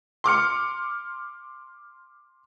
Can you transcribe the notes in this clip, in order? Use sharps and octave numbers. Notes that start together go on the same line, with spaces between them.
C6 D6 F6 C#7